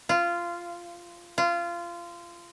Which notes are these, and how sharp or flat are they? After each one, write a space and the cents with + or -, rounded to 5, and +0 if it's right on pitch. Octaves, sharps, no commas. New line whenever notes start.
F4 -15
F4 -20